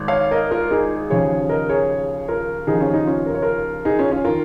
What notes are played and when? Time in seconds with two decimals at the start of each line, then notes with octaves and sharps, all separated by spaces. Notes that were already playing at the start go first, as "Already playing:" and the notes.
Already playing: G#1 G#2 D#3
0.08 C#5 F5
0.31 A#4 D#5
0.51 F4 A#4
0.71 D#4 G#4
1.10 D#2 C#3 F3 G#4 C#5
1.49 A#4 D#5
1.69 G#4 C#5
2.28 F4 A#4
2.67 D#2 C#3 F3 D#4 G#4
2.80 C#4 F4
2.93 D#4
3.07 C#4 F4
3.26 A#4
3.34 C#5
3.42 F4 A#4
3.85 D#4 G#4
3.99 C#4 F4
4.11 C#4 F4
4.24 D#3 F4 A#4